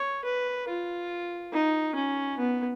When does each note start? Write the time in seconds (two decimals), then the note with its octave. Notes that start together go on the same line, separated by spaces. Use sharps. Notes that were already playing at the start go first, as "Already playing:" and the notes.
Already playing: C#5
0.25 B4
0.68 F4
1.52 D#4
1.95 C#4
2.38 B3